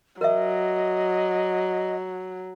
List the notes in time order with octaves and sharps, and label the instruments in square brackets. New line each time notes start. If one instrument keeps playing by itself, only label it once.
[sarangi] F#3 [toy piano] A#4 C#5 E5 [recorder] D#5